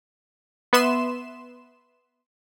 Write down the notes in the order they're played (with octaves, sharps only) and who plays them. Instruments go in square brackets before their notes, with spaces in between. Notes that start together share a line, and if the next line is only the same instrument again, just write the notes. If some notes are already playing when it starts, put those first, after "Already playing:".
[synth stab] B3 B4 E5 C6 E7